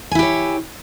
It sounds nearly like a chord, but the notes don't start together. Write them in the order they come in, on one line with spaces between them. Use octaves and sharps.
G#5 E4 G4 C#5